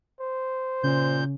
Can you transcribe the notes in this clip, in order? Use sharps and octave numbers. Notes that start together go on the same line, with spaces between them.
C5
A#2 C#3 C#4 G6